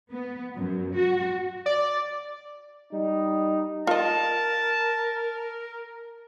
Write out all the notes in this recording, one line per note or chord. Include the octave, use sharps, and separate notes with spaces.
B3
F#2
F#4
D5
G3 D#4
F4 A#4 D#5 A5